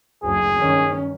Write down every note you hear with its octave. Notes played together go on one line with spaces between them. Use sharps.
F#1 D2 G#4
G2 D#3 C#4